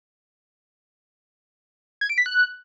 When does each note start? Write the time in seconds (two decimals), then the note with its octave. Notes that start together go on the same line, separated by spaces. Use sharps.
2.01 G#6
2.09 D7
2.18 B6
2.26 F#6